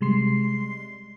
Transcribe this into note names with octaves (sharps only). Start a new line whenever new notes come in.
C3 G3 G#3 C6 C7